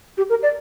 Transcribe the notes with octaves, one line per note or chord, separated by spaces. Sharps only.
G4
A#4
D5